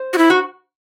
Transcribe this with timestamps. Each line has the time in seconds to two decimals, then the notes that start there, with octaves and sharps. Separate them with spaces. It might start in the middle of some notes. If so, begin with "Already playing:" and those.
Already playing: C5
0.13 F#4
0.18 E4
0.30 F#4